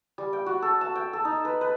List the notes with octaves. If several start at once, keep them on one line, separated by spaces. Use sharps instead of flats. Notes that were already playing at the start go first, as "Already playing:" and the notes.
G3
G5
F#4
A4
A5
G5
A4
D#4
B4
B4